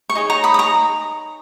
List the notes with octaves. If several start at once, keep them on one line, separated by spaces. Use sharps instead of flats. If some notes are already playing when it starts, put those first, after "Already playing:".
C#6
D#4 G#4 C#5
A#5 C#6
B5 D#6
D#6
A#5 C#6